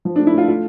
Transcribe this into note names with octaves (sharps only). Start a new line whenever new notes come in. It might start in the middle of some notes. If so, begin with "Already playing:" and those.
F3
D4
A3
E4
A3 F4
A3 F4